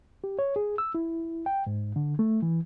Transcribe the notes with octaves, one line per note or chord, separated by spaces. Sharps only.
G4
C#5
G#4
E6
E4
G5
G#2
D3
A3
E3